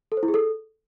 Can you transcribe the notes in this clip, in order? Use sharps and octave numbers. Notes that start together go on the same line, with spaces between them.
A4
C5
E4
G#4
A4